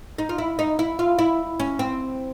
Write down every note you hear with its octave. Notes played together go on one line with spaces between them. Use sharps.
D#4
F4
E4
D#4
E4
F4
E4
C#4
C4